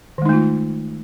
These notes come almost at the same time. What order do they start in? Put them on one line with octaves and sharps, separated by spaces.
D#3 G#3 D#4 A3 F4